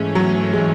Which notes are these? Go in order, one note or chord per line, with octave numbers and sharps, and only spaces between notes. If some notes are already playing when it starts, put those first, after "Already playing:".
Already playing: G#2 E3 G#3 A3 C#4
F#3
G#3